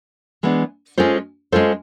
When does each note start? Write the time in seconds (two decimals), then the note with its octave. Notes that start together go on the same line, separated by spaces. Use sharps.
0.43 E3 G#3 B3 D4
0.98 G#3 C#4 F4 A4 C5
1.52 G#3 C#4 F4 A4 C5